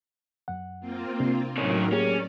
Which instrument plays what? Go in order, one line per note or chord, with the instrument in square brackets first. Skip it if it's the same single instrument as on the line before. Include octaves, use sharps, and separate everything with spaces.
[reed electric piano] F#2 F#5
[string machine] A#3 C4 F4
[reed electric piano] C3 D4
[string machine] A2 F#3 A#4 [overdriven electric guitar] D#3 C#4
[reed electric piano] A#3 G4 G#4 [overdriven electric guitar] C#4 [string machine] D5